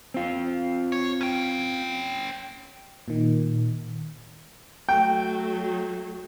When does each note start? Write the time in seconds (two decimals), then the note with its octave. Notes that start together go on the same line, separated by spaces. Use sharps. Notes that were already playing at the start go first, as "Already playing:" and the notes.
0.14 C4 F4
0.92 C#5
1.21 C#4 G5
3.08 A#2 D#3
4.89 F#3 A3 G5